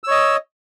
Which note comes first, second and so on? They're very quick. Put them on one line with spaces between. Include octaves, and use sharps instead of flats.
E6 C#5 D#5